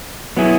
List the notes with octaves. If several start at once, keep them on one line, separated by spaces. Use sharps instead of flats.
F#3 B3 E4 G#4